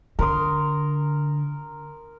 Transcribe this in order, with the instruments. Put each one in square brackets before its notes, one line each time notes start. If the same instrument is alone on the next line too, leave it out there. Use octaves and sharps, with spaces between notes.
[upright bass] D3 [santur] A#4 C6 D#6